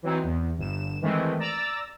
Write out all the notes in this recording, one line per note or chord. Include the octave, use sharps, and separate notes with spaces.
E3 F#3 C4 D#4
E2
G1 E7
D#3 E3 G#3 A3 C4
D5 A#5 E6 A6